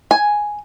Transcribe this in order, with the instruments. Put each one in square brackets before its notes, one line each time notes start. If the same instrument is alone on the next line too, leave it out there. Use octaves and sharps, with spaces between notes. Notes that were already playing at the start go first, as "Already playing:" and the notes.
[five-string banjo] G#5